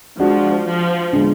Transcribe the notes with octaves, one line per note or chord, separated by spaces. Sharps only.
F3 G#3 D4 F#4
F3
D3 G#3 B3